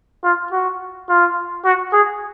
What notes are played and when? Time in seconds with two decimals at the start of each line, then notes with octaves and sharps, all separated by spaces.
0.23 F4
0.52 F#4
1.09 F4
1.65 F#4
1.93 G#4